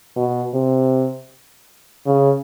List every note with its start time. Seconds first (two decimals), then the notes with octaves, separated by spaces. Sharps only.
0.16 B2
0.54 C3
2.06 C#3